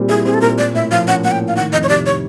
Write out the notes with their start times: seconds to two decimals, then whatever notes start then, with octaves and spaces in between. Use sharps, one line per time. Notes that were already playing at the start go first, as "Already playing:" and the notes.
Already playing: A#2 G3 C4
0.09 E4 G#4
0.25 C4 G#4
0.34 A4
0.41 A#2 A#4
0.58 A#3 D5
0.74 A2 E5
0.91 F3 F5
1.08 C#4 F#5
1.24 A#3 F#5
1.31 G5
1.40 A2
1.48 F5
1.56 D#3 F#5
1.73 F2 D#5
1.83 C#5
1.89 C3 D5
2.06 C#5